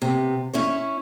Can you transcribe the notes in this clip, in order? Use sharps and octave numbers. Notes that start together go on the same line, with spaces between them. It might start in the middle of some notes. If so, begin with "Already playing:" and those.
C3 B3
C#4 E4 C#5